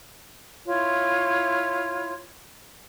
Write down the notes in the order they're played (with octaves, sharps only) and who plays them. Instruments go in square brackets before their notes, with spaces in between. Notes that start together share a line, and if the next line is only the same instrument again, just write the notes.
[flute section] E4 F4 C#5